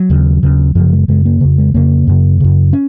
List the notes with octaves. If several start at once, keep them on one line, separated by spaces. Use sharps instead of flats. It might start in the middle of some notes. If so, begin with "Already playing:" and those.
Already playing: F#3
D#2 C#3
D#2 C#3
F#2 C#3 F3
G#3
F#2 C#3 G#3
A#3
F2 C#3
G#3
F2 C#3 A#3
F#2 C#3
F#2 C#3
C#4